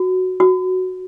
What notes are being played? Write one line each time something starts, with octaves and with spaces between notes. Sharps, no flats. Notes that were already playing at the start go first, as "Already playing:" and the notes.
Already playing: F#4
F#4